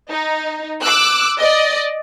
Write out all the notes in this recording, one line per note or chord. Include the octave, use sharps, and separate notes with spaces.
D#4
D6 E6 F#6
D5 D#5